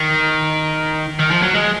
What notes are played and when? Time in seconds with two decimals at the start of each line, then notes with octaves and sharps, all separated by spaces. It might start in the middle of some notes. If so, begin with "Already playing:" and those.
Already playing: D#3
1.19 D#3
1.31 F3
1.42 F#3
1.54 G#3